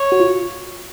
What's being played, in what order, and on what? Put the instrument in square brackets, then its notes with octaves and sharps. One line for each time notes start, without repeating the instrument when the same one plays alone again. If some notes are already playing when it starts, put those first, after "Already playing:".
Already playing: [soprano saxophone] C#5
[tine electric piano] F#4
F4